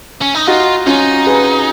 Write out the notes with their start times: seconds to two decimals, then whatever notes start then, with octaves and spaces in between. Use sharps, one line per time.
0.21 C#4
0.35 D#4
0.47 D#4 F4 F#4
0.87 C#4 D#4 F4
1.26 G#4 B4